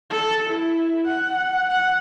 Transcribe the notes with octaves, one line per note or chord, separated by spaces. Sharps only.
A4
E4
F#5
F#5